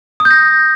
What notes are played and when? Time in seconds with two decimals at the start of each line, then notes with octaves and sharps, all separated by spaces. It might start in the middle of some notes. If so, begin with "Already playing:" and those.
0.20 D#6
0.25 G6
0.30 A#6